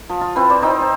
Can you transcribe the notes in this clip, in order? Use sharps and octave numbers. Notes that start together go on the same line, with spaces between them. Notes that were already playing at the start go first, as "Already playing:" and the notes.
F3
F4
C4 E4 B4 C5
E4 C5 D5
C4 D#4 G5
A5